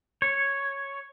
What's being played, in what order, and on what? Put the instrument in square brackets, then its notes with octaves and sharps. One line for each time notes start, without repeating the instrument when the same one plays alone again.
[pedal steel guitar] C#5